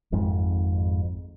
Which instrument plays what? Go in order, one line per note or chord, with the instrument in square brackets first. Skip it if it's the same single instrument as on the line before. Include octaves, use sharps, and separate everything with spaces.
[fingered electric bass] G#1 F2 G#2